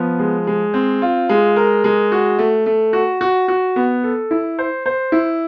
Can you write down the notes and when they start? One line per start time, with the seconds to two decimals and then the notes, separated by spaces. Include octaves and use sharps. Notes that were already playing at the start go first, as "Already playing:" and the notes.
Already playing: F3 B3
0.19 G#3
0.47 G#3
0.74 C4
1.02 F4
1.29 G#3
1.56 A#4
1.84 G#3
2.12 F#4
2.39 A3
2.66 A3
2.93 F#4
3.21 F#4
3.48 F#4
3.76 B3
4.03 A4
4.31 E4
4.59 C5
4.86 C5
5.12 E4